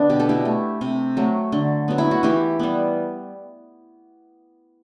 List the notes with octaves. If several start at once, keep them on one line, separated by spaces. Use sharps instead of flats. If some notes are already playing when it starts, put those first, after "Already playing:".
Already playing: D3 B3 D4
B2 G4
A4
E4 G4
A3
C3
F#3 A3
D3
F#3 B3
E4
F#4
E3 E4 G4
G3 B3